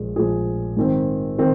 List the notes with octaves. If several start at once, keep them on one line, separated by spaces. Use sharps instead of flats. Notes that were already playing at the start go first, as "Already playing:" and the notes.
Already playing: A#1 A#2 G#3
A#1 A#2 G#3 G#4
G#2 D#3 C4
D#3 C4